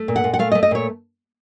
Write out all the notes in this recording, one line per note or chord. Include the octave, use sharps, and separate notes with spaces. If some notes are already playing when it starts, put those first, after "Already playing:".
Already playing: A3
A#2
F#5
A#2
F#5
A3 F5
D#5
A3
D#5
A#2 C#5